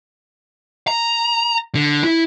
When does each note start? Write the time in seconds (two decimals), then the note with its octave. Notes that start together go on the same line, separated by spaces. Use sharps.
0.87 A#5
1.75 D3
2.04 E4